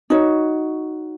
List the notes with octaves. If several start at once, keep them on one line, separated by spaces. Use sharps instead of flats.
D#4 F#4 C#5